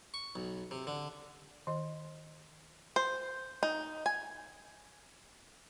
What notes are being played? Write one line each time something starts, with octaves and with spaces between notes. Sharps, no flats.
C#6
B1
C3
D3
D#3 D#5
C5
D#4
G#5